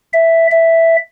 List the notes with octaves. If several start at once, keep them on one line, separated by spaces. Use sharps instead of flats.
E5
E5